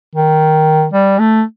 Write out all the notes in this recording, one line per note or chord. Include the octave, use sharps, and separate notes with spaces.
D#3
G3
A3